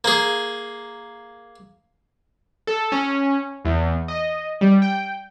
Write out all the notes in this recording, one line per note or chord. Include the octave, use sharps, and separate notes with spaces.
A#3 G#4
A4
C#4
E2
D#5
G3
G5